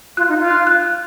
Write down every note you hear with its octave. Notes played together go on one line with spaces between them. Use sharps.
F4 F#6
D#4
F5
F4
F#6
F#6
F#6